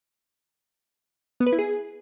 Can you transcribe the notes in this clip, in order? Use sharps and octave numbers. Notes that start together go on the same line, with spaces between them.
B3
B4
E4
G#4